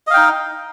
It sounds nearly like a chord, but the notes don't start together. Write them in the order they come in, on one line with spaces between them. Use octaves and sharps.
D#5 F5 G5 D#4